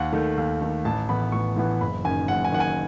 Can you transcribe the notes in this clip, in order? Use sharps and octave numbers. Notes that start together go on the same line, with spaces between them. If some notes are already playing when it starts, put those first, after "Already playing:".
Already playing: D#2 F#5
D#3 A3
D#2
D#3 A3
A1 A5
A2 E3 B3 B5
A1 C#6
A2 E3 B3
F#1 B5
F#2 D#3 G#5
F#1 F#5
G#5
F#2 D#3 F#5
G#5